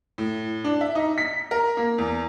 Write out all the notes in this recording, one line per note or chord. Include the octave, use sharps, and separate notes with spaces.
A2
D4
E5
D#4
B6
A#4
A#3
E2